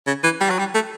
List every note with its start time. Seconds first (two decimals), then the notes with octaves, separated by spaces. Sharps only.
0.07 C#3
0.24 E3
0.41 G3
0.50 F#3
0.59 G3
0.74 A3